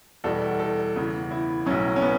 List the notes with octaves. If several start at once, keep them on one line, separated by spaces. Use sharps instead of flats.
E2 B2 G3 A4
A4
E2 C#3 E3
E4
B1 A2 F#3 C#4
C#4
B3